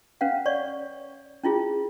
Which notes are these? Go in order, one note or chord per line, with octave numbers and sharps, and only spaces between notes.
C#4 B4 F5 F#5
C#5 D5 C#6
C#4 E4 F4 G#4